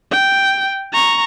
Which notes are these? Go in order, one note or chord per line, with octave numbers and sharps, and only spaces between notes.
G5
A#5 C#6